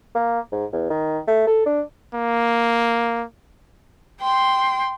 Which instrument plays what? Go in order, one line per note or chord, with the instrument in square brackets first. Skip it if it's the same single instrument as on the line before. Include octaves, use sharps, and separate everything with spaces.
[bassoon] A#3
G#2
E2
D#3
A3
A4
D4
[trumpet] A#3
[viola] G5 C6